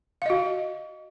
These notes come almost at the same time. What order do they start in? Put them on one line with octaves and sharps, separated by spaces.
F5 D#5 F#4